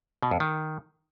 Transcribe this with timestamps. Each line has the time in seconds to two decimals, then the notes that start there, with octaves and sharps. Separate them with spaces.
0.23 B2
0.31 F2
0.40 D#3